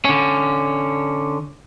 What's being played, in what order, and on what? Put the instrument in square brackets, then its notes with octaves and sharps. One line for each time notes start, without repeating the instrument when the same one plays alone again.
[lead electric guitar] D3 C#4